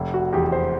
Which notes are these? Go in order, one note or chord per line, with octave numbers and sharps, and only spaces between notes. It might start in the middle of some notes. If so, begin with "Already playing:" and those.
Already playing: F1
F#4
E2 G4
C5